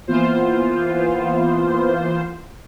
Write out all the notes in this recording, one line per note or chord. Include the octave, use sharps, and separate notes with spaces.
E3 A#3 B3 F4 C5